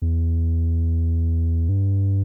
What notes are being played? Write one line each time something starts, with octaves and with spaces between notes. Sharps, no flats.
E2
G2